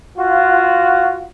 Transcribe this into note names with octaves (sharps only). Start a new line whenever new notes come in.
F4 F#4